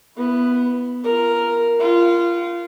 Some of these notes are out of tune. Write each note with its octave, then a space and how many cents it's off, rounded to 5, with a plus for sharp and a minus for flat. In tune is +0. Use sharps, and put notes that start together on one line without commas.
B3 +0 E4 +20
F4 -20 A#4 +0
F4 -20 F#5 +40